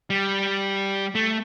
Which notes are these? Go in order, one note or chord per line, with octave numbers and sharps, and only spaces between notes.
G3
A3